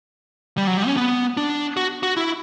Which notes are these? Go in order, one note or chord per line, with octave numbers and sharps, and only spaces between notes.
G3
F#3
G3
C#4
B3
D4
F#4
F#4
E4